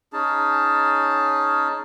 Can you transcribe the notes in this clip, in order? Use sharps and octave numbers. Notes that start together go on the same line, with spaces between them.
C#4 D#4 G#4 A5